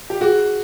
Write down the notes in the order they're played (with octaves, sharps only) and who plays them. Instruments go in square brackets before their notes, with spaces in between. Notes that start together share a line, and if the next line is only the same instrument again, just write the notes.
[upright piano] G4
[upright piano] F#4 [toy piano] G#4